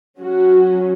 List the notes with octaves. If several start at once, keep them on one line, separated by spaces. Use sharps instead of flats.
F#3 C#4 F#4